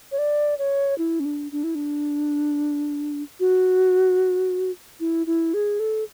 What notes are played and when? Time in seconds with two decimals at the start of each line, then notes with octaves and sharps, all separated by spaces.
0.12 C#5
0.18 D5
0.59 C#5
0.98 E4
1.20 C#4
1.25 D4
1.52 D4
1.64 E4
1.75 D4
3.40 F#4
5.00 E4
5.27 E4
5.54 G#4
5.80 A4